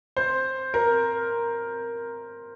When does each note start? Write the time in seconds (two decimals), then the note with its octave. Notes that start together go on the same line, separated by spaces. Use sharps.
0.17 C5
0.74 A#4